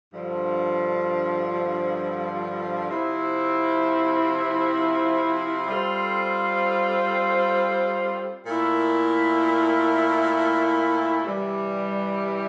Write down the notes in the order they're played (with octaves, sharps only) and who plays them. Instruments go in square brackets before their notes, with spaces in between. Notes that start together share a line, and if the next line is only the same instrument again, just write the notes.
[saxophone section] G2 D3 F3
C3 F3 C4 E4
G3 C4 F4 A4 C5
A#2 A3 E4 A#4
C3 E3 G3